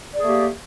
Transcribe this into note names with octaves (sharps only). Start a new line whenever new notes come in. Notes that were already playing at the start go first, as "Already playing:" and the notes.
A3 A#3 G4 G#4 D5